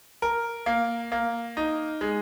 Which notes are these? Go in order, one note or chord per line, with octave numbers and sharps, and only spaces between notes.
A#4
A#3
A#3
D#4
G#3